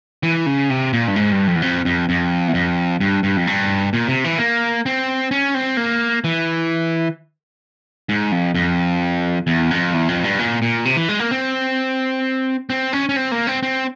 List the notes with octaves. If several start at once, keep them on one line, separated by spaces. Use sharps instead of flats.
E3
C#3
C3
A#2
G2
G#2
G2
F2
E2
F2
F2
F2
E2
F2
G2
G2
F2
G2
A#2
C3
E3
A#3
C4
C#4
C4
A#3
E3
G#2
F2
F2
E2
F2
E2
F2
G2
A#2
A#2
C3
E3
G#3
A#3
C4
C4
C#4
C#4
C4
A#3
C4
C4